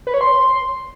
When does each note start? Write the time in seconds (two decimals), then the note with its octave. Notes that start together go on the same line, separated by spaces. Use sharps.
0.07 B4
0.14 C#5
0.21 C6